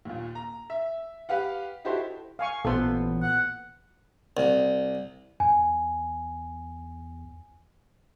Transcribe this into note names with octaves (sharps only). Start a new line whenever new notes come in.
D#2 A#2
A#5
E5
G4 B4 F5 F#5
D#4 E4 F#4 G4 A4 C5
F5 G#5 C#6
A1 A#2 B3 A4 C5 C6
F#5
C2
E2 G#5